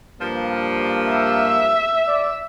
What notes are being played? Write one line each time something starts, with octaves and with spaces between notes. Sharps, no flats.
G2 F3 A#3
E5
D5